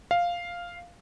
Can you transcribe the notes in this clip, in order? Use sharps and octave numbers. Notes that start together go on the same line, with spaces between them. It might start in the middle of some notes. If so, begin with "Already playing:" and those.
F5